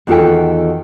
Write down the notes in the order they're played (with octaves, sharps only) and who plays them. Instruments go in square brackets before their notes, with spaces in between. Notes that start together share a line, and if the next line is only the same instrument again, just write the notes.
[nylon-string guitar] E2 D#3 F4 F#4 A4 G5